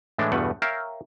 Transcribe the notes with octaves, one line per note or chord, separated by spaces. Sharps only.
A2 E3 G#3 A3 D4
E2 G2 B2 A3 F#5
A#4 C#5 E5 F5 G5